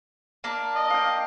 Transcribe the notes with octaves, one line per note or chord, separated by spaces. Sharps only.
A#3 D4
D#5
F5 G5